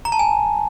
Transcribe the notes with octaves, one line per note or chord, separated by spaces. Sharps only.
A#5
A5
G#5